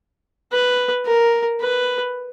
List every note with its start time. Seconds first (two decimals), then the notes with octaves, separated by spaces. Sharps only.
0.52 B4
1.06 A#4
1.61 B4